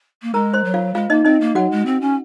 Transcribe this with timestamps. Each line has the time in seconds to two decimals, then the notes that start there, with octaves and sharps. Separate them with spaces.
0.22 A#3
0.34 G#3 A#4 A#5
0.53 C5 C6
0.65 F#3
0.74 F4 F5
0.94 G#3 F4 F5
1.10 A#3 D#4 D#5
1.25 C4 D#4 D#5
1.41 A#3
1.55 F#3 F#4 F#5
1.71 G#3
1.86 C4
2.01 C#4